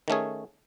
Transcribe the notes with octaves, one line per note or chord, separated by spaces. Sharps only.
D#3 A3 C#4 G#4